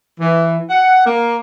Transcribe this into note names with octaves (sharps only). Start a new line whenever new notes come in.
E3
F#5
A#3